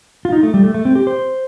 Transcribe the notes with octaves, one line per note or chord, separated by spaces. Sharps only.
F4
D#4
A3
G3
A3
A3
C4
G4
C5